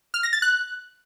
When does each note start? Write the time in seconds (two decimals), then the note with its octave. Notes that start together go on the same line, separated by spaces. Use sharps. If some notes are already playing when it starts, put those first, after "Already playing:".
0.14 F6
0.23 A#6
0.33 A6
0.42 F#6